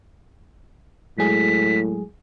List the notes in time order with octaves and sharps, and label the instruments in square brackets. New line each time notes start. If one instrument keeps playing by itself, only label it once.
[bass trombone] A2 [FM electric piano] F#3 G#3 G#4 [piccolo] B6